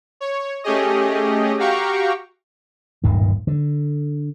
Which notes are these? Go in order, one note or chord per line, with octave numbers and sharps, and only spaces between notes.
C#5
A3 C#4 G4 G#4 D#5
F#4 G4 F5 G5 A#5 C#6
D1 G1 A#2 D#3
D3